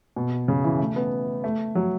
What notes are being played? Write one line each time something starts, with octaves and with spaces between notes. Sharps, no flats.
B2
C#3
E3
A3
B3
A3
F#3